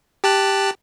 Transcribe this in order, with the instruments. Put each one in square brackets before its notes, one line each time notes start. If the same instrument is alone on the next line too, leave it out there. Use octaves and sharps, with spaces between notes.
[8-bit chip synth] G4 A5 F#6